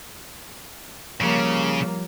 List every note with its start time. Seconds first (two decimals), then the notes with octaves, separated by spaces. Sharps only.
1.21 C#3 F3 G3 A#3 C#5